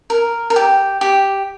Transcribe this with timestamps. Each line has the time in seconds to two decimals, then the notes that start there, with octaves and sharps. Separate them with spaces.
0.10 A#4
0.50 A#4
0.56 G4
1.01 G4